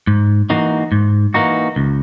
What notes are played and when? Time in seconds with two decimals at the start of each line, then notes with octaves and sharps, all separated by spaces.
0.07 G#2
0.50 E3 A#3 D#4 F#4
0.92 G#2
1.34 E3 A#3 D#4 F#4
1.76 C#2